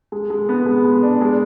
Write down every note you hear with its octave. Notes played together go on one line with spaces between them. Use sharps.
G#3
G#3
B3
G#3
G#3
D4
G#3